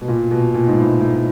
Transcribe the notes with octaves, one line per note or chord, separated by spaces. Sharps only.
B2
A#2
B2
A#2
G#2
A2
A2